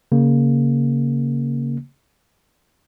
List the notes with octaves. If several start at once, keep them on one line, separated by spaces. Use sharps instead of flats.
C#3 A#3